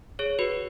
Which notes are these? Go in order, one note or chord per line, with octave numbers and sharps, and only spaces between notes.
G#4 C#5
F#4 B4